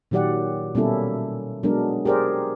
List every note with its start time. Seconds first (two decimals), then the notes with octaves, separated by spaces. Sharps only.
0.11 A#2 D#3 F#3 G4 D5 F#5
0.75 B2 G3 A#3 C#4 E4 A4
1.63 F#3 G#3 B3 D4 A#4
2.05 G4 G#4 A#4 C5 D5